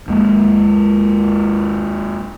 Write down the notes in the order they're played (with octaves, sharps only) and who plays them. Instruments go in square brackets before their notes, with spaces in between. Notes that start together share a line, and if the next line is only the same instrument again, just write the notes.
[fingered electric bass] D#2 G#3 A#3